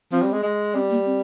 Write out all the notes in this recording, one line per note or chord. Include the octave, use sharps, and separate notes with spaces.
F3 C4
G3
G#3
G#3
G3 C4
A#3
C4